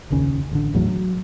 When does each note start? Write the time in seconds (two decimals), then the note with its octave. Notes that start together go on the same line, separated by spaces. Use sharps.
0.10 F1 A#1 D#2 C#3
0.51 A1 D3
0.73 G#1 E2 A2 F#3
0.88 F#3